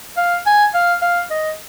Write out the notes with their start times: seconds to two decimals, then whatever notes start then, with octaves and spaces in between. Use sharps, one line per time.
0.17 F5
0.46 G#5
0.74 F5
1.02 F5
1.31 D#5